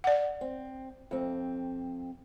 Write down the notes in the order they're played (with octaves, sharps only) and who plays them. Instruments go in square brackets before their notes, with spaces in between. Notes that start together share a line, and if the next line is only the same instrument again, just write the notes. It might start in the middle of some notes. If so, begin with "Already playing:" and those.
[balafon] D5 F#5
[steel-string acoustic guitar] C4
F2 C4